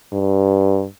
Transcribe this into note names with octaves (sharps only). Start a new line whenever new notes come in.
G2